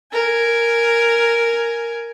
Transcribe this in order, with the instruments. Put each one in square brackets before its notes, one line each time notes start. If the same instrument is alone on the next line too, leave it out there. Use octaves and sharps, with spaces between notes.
[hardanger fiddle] A#4 G#5